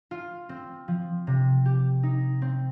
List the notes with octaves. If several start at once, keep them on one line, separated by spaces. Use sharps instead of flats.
F4
C4
F3
C3
G4
D#4
C4